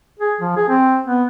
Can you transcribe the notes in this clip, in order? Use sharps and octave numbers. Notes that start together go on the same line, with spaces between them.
G#4
F3
G#4
C4
B3